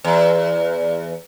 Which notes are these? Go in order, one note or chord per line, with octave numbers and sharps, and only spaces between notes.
E2